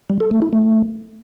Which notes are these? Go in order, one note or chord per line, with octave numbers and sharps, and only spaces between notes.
G3
A4
A3
E4
A3